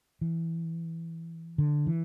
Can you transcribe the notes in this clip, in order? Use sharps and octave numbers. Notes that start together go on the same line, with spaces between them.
E3
D3
E3